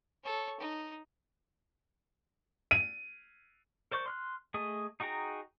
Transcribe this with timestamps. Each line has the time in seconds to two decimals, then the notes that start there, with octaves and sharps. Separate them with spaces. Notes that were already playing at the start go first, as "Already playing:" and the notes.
0.23 A4 C#5
0.60 D#4
2.71 D#7
3.91 A#4 C5 D5 C#6 G6
4.06 C6 F6 F#6
4.54 A3 G#4 D#5
5.00 D#4 F#4 G#4 G5 A#5